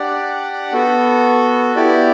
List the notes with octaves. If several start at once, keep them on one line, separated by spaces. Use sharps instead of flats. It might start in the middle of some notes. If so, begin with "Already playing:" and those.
Already playing: D4 G4 D5 F#5
B3 F#4 A4
B3 E4 G4 D5